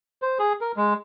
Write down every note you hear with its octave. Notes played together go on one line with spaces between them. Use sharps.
C5
G#4
A#4
G#3